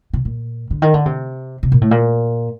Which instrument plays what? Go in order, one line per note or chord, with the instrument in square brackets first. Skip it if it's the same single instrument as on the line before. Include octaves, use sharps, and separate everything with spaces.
[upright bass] C3
A#2
D3
D#3
D3
C3
C3
A#2
A2
A#2